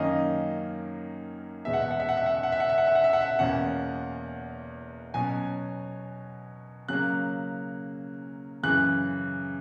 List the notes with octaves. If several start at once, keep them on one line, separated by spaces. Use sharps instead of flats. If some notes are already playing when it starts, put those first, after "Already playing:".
Already playing: F#2 D#3 A#3 C#4 D#5
E2 B2 G#3 B3 E5
F#5
E5
F#5
E5
F#5
E5
F#5
E5
F#5
E5
F#5
E5
F#5
E5
F#5
E5
F#5
E5
E2 B2 A#3 C#4 F#5
B2 F#3 C#4 G#5
C#3 F#3 A#3 F#6
F#2 C#3 E3 F#6